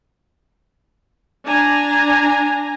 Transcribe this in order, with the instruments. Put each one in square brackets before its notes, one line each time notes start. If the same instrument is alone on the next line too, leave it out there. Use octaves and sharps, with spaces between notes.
[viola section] D4 G#5 A#5